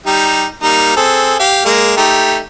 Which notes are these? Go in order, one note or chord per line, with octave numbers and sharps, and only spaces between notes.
G3 D#4 G4
G3 A#3 D#4
C4 G#4 A4
G4 F5
G#3 A#3
A3 D#4 G4